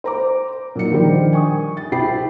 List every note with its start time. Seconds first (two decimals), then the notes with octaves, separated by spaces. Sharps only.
0.04 C5 A#5 D6
0.75 A#2 F#3 D#4 C#7
0.90 D3 D#3 F3 G3 G4 C5
1.33 G#5 C#6 D#6
1.77 A6
1.91 C2 C4 G4 B5 C7